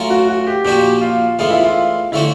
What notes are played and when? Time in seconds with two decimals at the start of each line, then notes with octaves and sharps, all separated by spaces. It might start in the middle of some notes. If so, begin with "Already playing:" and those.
Already playing: F#3 A3 C#4 F4 A#4
0.10 F#4
0.29 F#4
0.47 G4
0.65 A#2 F3 A#3 D4 F#4 G4
1.01 F4
1.39 A2 E3 G#3 B3 F4
1.51 E4
1.63 F4
2.12 D3 F3 A3 C#4 E4 F#4